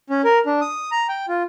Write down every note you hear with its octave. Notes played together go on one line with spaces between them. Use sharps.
C#4
A#4
D4
D#6
A#5
G5
F4